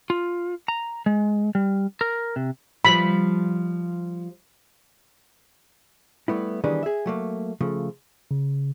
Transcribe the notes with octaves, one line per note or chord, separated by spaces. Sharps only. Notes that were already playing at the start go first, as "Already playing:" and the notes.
F4
A#5
G#3
G3
A#4
C3
F3 G3 B5
G3 A3 B3 E4
D#3 E3 G3 B3 D4 G#4
G#4 E5
F#3 A3 A#3
C#3 F3 A3
C#3